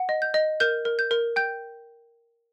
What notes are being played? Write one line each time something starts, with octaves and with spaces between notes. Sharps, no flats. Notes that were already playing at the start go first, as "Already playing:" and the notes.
Already playing: F#5
D#5
G6
D#5
A#4 G6
A#4
G6
A#4
G5 G6